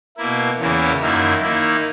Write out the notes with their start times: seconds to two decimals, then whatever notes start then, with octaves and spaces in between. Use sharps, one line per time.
0.17 B2 A#3 E4
0.58 E2 C#3 E3 A#3 E4
1.01 F#2 D#3 A#3 E4
1.42 D#3 A#3 E4